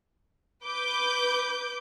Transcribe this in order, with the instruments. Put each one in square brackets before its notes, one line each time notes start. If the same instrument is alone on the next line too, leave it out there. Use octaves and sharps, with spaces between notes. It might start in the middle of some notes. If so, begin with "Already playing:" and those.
[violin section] B4 D6 G6